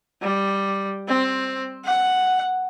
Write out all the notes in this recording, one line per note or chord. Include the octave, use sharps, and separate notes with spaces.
G3
C4
F#5